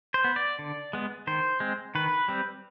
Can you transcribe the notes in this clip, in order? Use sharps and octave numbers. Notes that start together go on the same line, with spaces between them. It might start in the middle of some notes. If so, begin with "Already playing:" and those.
C5
B3
D5
D3
G#3 B3
D#3 C5
G#3 C4
D#3 B4
G3 C4